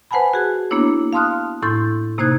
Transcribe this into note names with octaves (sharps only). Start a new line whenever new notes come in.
B4 C5 F#5 G#5 A5 B5
F#4 G#4
A#3 B3 D4 E4 C#5
F5 A5 C6 D#6 F6 F#6
A2 E4 C6 G6 A6
C3 A#3 D#4 C5 F#6 G#6